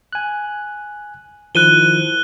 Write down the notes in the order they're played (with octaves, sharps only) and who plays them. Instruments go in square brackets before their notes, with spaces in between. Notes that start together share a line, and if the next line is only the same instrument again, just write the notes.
[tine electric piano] G#5 F#6
[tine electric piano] D#3 F3 E4 [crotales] F#6 D#7 G7